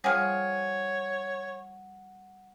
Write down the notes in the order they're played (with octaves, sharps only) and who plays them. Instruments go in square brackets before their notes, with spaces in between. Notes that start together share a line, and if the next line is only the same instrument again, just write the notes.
[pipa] F3 G#4 [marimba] G3 [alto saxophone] C#5 [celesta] F#5